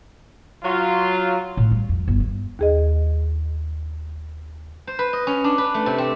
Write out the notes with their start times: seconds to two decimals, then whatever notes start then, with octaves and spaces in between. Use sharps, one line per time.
0.63 F#3 F4
1.57 A2
1.71 G3
1.89 F2
2.08 G1
2.20 E2
2.59 D#2 G#4 D#5
4.87 C5
4.99 B4
5.13 D#5
5.27 C#4
5.44 D4
5.58 B4
5.74 A3
5.86 C3
5.98 C4